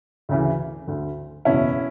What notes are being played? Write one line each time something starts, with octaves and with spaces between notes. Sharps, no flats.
D2 C#3 E3
D2 D3
F#1 E2 B2 C#4 E4